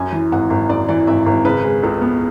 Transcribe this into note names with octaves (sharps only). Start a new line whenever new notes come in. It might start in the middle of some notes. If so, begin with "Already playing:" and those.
Already playing: F#2 G#5
E3
G#1 F#5
G#1
F#2 D5
E3 D5
G#1 E5
G#1
C#3 B4
G#3
C#2 A4
B3